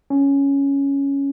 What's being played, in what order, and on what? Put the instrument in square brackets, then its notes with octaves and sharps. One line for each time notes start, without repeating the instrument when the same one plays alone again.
[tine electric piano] C#4